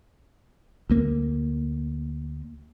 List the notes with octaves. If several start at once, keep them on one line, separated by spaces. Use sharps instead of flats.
D2 A#3